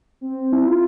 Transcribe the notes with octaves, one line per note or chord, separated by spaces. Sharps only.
C4
E4
F4